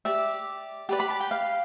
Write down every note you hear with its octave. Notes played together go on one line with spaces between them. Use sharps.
G4 D5 E5
G4 B4 D5
B5
A5
G5
F5